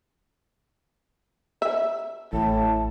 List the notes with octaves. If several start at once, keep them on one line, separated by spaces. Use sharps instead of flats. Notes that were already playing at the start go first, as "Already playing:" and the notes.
E5
A1 A2 A5